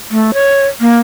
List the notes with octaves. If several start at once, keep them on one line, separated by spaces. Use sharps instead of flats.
A3
C#5
A#3